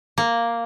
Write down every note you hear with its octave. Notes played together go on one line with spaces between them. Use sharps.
A#3